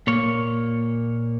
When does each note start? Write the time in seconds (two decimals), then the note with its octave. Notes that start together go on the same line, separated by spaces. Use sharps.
0.07 A#2 A#3 C#5